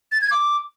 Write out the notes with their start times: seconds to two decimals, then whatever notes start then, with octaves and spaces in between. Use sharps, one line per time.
0.12 A6
0.21 G#6
0.31 D6